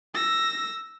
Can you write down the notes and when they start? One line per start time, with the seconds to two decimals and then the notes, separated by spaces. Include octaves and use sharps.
0.15 E6 A#6